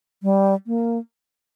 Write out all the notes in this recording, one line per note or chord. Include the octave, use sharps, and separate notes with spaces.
G3
A#3